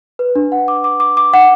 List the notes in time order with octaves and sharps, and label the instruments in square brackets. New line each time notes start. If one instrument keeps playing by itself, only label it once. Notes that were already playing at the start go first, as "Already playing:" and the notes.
[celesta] B4
D4
F#5
D6
D6
D6
D6
F#5